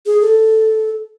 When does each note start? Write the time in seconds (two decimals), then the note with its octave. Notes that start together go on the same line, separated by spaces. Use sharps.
0.06 G#4
0.21 A4